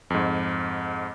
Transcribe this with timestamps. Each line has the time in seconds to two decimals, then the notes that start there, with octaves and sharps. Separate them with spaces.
0.10 F2 G#2